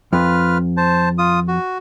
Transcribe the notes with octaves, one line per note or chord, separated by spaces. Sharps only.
F2 F4 B4 F6
C5 A5
F4 D#6
F#4